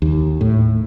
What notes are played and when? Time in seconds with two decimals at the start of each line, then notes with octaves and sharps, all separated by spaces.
0.02 D#2
0.41 A2